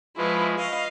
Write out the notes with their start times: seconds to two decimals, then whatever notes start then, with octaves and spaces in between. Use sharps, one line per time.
0.17 F3 G#3 E4 B4 B5 C#6
0.58 D#5 F5